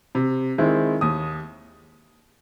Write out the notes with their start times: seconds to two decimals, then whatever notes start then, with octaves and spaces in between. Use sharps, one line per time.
0.15 C3
0.58 D#3 G#3 C4 E4
1.01 D#2 D#6